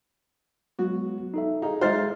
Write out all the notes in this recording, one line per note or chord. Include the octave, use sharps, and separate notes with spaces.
F#3 G#3 B3 F#4
D#4 A4 E5
D#4 G#4 F5
G#3 D#4 C5 E5 F6 A6